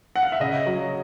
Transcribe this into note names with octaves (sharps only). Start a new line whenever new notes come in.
F#5
F5
E5
C#3 D#5
F#3